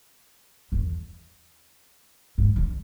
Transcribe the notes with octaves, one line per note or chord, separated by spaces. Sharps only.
E2
G#2
D3